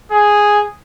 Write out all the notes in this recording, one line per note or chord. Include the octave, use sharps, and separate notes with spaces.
G#4